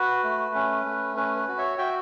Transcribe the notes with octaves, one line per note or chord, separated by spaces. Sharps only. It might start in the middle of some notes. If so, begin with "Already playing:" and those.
Already playing: F#4 B4
A3
C#4
A3
C#4 B4
B4
F#4
C#5 E5
F#4 E5 G5